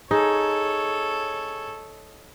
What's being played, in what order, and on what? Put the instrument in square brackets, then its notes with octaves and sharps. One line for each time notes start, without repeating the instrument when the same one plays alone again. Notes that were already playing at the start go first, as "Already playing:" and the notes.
[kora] D#4 [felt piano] G#4 [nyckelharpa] A4 C#5